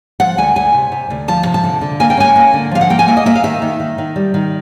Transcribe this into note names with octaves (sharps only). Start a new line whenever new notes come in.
F3 F#5
D2 G#5
D2 G#5
C3
C3
D2
F3 A5
C3
A5
D3
D3
A#3 G#5
G5
C#4 G#5
A#3
D3
F3 F5
F#5
A#3 G5
G#5
A#3 E5
D#5
A#3 E5
F5
D#3 E5
D#3
D#3
D#3
G3
D#3